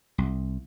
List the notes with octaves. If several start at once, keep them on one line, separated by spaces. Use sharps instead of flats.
C2